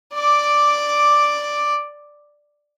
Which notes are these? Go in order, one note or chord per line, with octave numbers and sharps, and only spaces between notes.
D5 D6